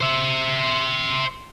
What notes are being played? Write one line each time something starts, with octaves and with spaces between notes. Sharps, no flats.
C5 E5